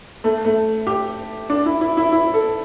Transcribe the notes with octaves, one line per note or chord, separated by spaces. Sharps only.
A3
A3
G4
D4
E4
E4
E4
E4
A4